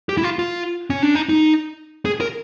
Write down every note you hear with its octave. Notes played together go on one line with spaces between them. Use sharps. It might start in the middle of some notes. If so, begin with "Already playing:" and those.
G4
E4
F4
F4
C#4
D4
D#4
D#4
G#4
A#4